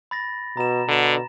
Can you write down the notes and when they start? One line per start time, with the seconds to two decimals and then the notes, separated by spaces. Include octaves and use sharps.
0.11 B5 A6 A#6
0.57 B2 A#5 E7
0.88 B2 D3